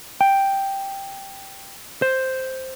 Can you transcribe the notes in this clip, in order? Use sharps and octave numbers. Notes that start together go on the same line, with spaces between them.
G5
C5